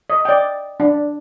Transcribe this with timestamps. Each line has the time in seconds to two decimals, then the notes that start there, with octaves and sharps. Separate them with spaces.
0.10 D#5
0.25 D5 G5
0.80 D4